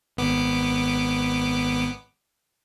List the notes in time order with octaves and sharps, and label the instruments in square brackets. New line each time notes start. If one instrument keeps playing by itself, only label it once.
[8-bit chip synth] G#1 B3 D6